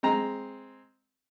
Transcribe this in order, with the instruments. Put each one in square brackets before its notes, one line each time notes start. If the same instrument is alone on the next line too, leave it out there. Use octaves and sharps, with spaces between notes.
[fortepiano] G#3 C4 A#5